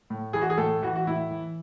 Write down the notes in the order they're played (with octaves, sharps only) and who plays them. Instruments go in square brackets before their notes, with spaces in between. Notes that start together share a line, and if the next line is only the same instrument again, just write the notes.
[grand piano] A2
E3 G#4
F#4
G#4
A2 A4
E3 F#4
F#4
A2 E4
E3